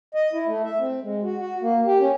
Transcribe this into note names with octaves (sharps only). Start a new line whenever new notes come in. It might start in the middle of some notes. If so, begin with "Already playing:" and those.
D#5
E4
A3
E5
C4
G#3
F#4
F#4
A#3
G4
C#4